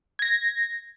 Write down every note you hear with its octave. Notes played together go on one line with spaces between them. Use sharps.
G#6 A#6